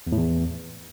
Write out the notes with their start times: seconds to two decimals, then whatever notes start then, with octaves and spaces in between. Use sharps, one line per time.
0.07 E2
0.12 A2
0.18 E2